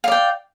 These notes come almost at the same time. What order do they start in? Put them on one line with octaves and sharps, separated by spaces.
F5 D5 G5